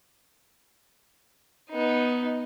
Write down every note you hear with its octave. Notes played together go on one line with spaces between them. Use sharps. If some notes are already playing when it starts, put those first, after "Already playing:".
B3 D#4